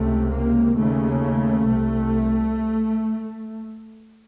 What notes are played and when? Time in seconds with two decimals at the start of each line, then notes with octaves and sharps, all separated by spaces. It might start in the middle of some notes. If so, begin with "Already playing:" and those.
Already playing: C#2 C3 A3
0.30 A#3
0.76 D#2 C#3 A3
1.67 C2 C3